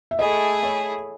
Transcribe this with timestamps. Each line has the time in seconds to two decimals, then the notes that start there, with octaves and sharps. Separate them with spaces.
0.11 E5
0.19 A3 E4 G#4 D#5
0.63 C#5